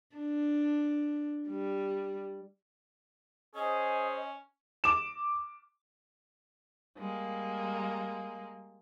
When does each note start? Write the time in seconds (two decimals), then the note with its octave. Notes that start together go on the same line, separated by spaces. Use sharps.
0.16 D4
1.49 G3
3.55 C#4 G#4 C5 D#5
4.84 D6 E7
6.98 G3 G#3 A#3